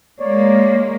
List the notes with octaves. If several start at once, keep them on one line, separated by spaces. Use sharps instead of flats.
G#3 A#3 C#5 D5